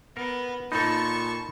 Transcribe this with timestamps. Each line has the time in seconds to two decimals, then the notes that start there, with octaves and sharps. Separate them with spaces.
0.17 B3 A#4
0.72 A#2 D#4 A4 A5 B5 C#6